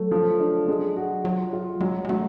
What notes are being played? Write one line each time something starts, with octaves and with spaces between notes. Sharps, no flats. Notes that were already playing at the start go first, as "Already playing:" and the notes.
Already playing: F#3 A3
F3
D4
G#3
F#4
F#3 F4
F4
F#3 G#3
G#3
F#3 A3